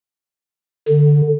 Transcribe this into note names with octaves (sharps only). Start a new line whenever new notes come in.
D3